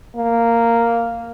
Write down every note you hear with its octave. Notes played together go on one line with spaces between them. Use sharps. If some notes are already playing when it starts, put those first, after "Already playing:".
A#3